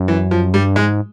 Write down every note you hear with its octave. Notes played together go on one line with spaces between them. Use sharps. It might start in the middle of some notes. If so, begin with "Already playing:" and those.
Already playing: F#2
E3
F3
G2 G3
G#2 G#3